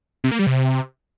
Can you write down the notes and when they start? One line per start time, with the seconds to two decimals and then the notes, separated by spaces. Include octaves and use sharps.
0.24 C3
0.31 A#3
0.39 G3
0.47 C3